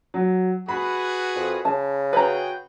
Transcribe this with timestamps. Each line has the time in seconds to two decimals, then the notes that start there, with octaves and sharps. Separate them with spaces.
0.14 F#3
0.69 F#4 G#4 B4 B5
1.36 F2
1.65 C#3 A5
2.13 F#4 G#4 B4 G5 A#5